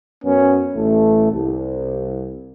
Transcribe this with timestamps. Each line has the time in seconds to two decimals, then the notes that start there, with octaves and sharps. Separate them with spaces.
0.24 F#2 B3 C#4
0.75 A1 A3
1.32 C2